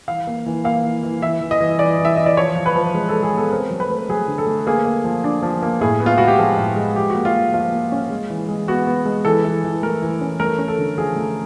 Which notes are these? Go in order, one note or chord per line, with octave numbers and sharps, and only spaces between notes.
E3 F5
A#3
E3
A#3 F5
E3
E3
E3 E5
E3
D#5
E3
E3 D5
E3
E5
E3 D#5
D5
F3 C#5
F3
B4
F3
G#3
G#3 A4
G#4
B3 A4
C4 A#4
F#3
B4
A3
F#3 G#4
D3
A4
A3
A#3 G#4
A#3
F3
D4
F3
A#3
A2 G#4
B3
F4
G#3 F#4
G4
F3 G#4
A2
G#3
F3 G4
A#3 F#4
F4
F3
F3 F4
A#3
C#4
G#3
E3
G#3
B3 F#4
B3
G#3
E3 A4
E3
E3
A3 A#4
E3
C#4
A3 A#4
C#4
A4
D3
F3 G#4
A3